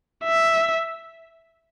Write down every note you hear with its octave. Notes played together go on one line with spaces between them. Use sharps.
E5